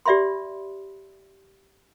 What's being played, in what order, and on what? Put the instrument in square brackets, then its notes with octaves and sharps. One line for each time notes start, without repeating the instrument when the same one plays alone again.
[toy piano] G4 D5 E5 B5 C6